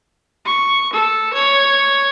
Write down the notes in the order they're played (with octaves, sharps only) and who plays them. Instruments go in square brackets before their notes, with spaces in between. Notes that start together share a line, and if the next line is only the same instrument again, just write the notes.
[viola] C#6
A4
C#5